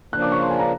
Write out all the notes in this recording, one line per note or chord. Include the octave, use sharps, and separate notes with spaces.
C#3 F3 A#3 D4 F#6
D6
C#6
C6
G#5
A#5